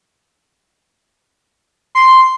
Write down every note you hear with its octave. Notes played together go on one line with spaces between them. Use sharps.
C6